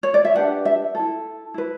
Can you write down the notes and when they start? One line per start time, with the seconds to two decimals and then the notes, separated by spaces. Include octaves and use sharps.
0.03 C#5
0.14 D5
0.25 E5
0.35 D4 G4 B4 F#5
0.65 E5
0.95 E4 A4
1.54 E4 B4